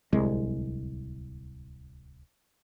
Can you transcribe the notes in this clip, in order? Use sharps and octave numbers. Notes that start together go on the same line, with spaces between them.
D1 C2 G#3